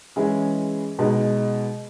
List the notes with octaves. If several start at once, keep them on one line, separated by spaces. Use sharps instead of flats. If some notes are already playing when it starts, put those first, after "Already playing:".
E3 G#3 C#4 E4 G#4
B2 G#3 D#4